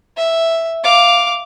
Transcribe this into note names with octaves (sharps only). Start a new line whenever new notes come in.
E5
F5 D6